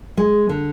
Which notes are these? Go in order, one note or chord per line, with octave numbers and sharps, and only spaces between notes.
G#3
D3